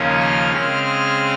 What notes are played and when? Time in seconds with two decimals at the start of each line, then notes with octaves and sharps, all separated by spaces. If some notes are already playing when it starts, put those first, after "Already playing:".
Already playing: D#2 C#3 F3 A#3 C#4
0.20 F6
0.52 C#3 G#3 C4 F6
0.83 F6